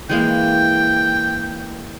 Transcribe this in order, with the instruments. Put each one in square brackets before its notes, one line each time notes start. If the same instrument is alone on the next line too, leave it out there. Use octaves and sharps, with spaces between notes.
[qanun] E3 G#3 A#3 [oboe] G5